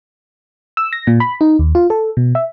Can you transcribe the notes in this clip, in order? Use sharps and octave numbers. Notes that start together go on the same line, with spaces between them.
E6
A#6
A#2
B5
D#4
D#2
F4
A4
B2
E5